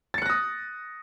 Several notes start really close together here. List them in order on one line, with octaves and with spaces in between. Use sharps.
A6 C#7 F#6 A#6 D#6